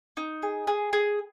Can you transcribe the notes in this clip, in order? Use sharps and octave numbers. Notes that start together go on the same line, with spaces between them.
D#4
G#4
G#4
G#4